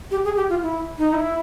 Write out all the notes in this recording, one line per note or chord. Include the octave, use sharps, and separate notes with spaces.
G4
G#4
G4
F4
E4
D#4
E4